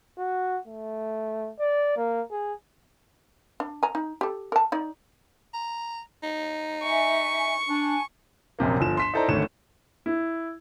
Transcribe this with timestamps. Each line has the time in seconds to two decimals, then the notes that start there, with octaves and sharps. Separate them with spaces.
0.18 F#4
0.68 A3
1.59 D5
1.97 A#3
2.31 G#4
3.60 D4
3.83 G#5 A#5
3.95 D#4
4.21 G4 A4
4.52 A#4 A5
4.72 D#4 D5
5.54 A#5
6.23 D#4
6.83 E5 G#5 C#6
7.69 D4 G#5 A5
8.59 A#1 F#2 C3 A#3
8.80 G1 F3 E7
8.97 C6 B6 E7
9.14 D#4 E4 A4 C5 D5 A#5
9.28 G#1 D3 A3 C#5 E7
10.06 E4